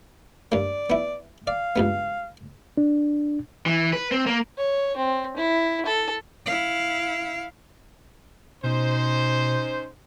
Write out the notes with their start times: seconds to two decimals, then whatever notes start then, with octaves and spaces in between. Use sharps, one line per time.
0.52 G2 A#3 D5
0.90 B3 E4
1.47 D5 F5
1.76 C#2 G2 B3
2.77 D4
3.66 E3
3.93 B4
4.12 C4
4.26 A#3
4.58 C#5
4.97 C4
5.36 E4
5.86 A4
6.46 E4 F5
8.63 B2 C#4 D#4 C5